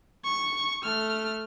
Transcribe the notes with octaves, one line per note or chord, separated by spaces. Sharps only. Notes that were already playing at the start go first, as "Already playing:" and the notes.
C#6
A3 F6